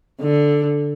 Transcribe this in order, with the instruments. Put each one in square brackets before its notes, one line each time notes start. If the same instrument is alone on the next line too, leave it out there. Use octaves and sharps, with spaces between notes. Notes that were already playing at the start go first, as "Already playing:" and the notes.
[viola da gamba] D3